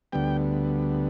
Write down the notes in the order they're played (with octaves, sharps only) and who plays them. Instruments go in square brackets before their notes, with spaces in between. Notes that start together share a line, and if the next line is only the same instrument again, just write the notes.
[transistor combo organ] D2 D3 G3 B3 G5